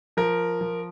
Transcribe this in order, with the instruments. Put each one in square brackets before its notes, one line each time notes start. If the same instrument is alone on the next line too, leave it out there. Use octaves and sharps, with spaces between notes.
[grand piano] F3 A#4
F3